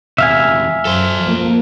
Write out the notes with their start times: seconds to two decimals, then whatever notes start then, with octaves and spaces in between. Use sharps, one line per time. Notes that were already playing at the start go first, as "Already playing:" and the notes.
0.18 E2 C3 E5 F5 G#5
0.85 F#2 A4 C5
1.22 F3 A#3